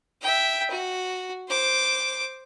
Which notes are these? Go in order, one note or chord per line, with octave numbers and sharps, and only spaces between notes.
E5 G5
F#4
C5 D6